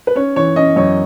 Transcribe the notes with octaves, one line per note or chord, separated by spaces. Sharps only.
B4
C#4 C#5
E3 C#5
C#4 D#5
F#2 C#5